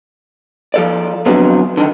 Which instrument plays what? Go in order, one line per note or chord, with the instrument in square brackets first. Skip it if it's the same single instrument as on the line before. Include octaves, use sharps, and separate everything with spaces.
[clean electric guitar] F3 A4 D5
D3 F3 F#3 B3 C4 D4
D3 D#3